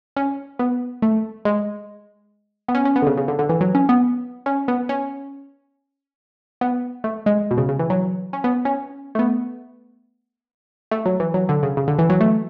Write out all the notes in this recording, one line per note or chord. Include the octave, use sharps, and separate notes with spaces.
C#4
B3
A3
G#3
B3
C#4
C#4
B3
D3
C#3
C#3
D3
D3
E3
F#3
C#4
B3
C#4
B3
C#4
B3
A3
G#3
B2
C#3
C#3
E3
F#3
C#4
B3
C#4
A3
B3
A3
F#3
E3
F#3
D3
C#3
C#3
D3
E3
F#3
A3